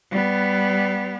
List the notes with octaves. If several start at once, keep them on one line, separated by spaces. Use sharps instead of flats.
G3 B3